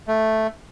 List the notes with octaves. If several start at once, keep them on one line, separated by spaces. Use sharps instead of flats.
A3